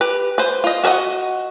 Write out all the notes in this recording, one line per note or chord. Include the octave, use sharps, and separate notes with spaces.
G4 B4
B4 C5
F4 D#5
F#4 A#4 B4 D#5 F#5